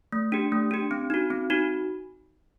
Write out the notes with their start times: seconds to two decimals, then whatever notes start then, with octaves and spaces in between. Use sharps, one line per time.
0.12 A3
0.32 D4 G4
0.52 A3
0.71 D4 G4
0.91 C4
1.10 D#4 F#4
1.30 C4
1.50 D#4 F#4